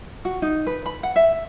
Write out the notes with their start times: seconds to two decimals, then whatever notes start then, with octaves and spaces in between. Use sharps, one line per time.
0.25 F#4
0.42 D#4
0.67 B4
0.86 B5
1.03 F#5
1.16 E5